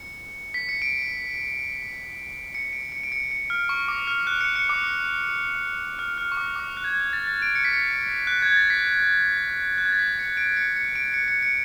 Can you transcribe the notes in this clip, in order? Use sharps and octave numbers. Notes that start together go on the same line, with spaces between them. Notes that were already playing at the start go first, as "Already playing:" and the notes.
Already playing: C#7
B6
C#7
D7
C#7
D7
C#7
D7
C#7
C#7
F6
C#6
D6
F6
F#6
C#7
C#7
D6
D6
F6
F6
C#6
D6
D6
F#6
G#6
A6
A6
D7
C#7
B6
C#7
F#6
G#6
A6
B6
F#6
G#6
A6
B6
C#7
D7
C#7
C#7
D7
C#7
C#7
C#7